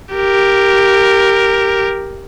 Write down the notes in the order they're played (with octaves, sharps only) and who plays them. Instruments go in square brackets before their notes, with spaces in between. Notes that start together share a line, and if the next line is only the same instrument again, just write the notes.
[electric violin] G4 A#4